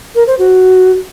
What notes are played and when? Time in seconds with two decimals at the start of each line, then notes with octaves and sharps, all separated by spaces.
0.15 A#4
0.27 C5
0.39 F#4